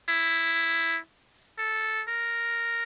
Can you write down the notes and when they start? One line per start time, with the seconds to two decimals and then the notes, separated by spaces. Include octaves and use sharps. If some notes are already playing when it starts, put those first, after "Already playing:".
0.09 E4
1.58 A4
2.08 A#4